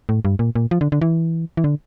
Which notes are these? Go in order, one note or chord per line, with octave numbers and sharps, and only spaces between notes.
A2
G2
A#2
A#2
F3
D3
D3
E3
E3
D3